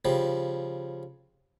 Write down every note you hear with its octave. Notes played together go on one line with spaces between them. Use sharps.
C#3 F3 G3